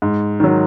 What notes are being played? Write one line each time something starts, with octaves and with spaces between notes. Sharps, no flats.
G#2
D#3 F#3